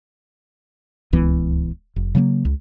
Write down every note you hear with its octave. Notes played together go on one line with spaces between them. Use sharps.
D1 C#2 E3 B3
F1
C#3 F#3 A3 A#3
C#2